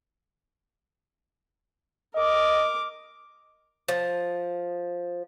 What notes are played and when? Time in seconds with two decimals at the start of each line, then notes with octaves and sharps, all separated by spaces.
2.16 A#4 D#5 D6
3.88 F3